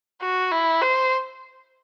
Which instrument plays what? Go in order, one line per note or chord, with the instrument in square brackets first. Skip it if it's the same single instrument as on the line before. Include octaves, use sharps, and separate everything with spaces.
[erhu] F#4
E4
C5